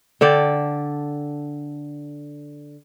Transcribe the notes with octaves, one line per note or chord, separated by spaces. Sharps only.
D3 A4 D5 G5